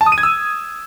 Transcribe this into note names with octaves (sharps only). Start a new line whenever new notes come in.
A5
D#6
D#7
G#6
E6